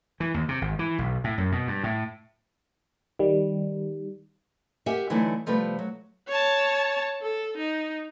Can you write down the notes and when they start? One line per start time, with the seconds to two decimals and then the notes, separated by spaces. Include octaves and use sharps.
0.20 E3
0.34 D#2
0.48 C3
0.61 G#1
0.79 E3
0.98 B1
1.24 A2
1.38 F#2
1.52 B2
1.67 G2
1.83 A2
3.19 D#3 G3
4.86 G4 A#4 E5 F#5 G#5
5.10 D3 E3 F#3 A3 D#4 E4
5.46 C3 F3 G3 A3 B3 B4
5.79 F#3
6.28 C#5 A5
7.23 A4
7.57 D#4